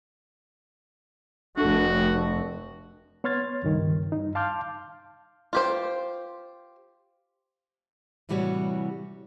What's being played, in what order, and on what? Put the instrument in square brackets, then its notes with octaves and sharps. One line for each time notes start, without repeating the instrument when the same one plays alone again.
[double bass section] F1 A3 [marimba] D4 A4 [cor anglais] F#4
[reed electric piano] B3 C#5 C6 F6 G#6 A6
C#2 G2 D#3
G2 D#4
F5 A5 C6 D6 F6 G6
[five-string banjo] F4 G4 C5
[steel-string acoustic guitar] A2 C3 E3 G3 F#4 C#5